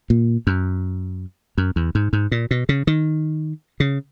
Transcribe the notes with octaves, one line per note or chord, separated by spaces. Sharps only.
A#2
F#2
F#2
E2
G#2
G#2
A#2
B2
C#3
D#3
C#3